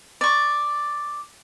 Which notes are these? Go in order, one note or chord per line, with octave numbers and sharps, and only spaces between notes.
D5 C#6